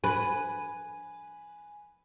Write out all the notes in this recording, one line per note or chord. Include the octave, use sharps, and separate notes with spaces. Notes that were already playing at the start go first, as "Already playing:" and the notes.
B4 G#5